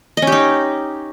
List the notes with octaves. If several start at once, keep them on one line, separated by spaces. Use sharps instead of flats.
D#5
C#4
G4
D#4